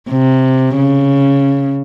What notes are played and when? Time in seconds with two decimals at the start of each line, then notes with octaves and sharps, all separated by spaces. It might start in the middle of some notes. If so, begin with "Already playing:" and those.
0.10 C3
0.76 C#3